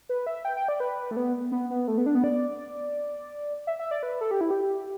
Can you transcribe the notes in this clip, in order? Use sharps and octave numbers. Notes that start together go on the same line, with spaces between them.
B4
E5
G5
G5
D5
B4
A3
B3
B3
B3
A3
B3
D4
B3
D5
E5
E5
D5
B4
A4
G4
E4
G4